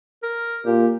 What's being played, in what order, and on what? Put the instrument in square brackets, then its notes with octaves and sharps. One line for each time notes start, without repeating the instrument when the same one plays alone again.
[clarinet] A#4
[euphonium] A#2 [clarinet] G4